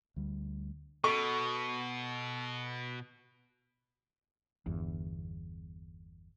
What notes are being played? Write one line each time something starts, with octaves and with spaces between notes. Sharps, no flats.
D2 G3
B2 A4 C#6
G1 E2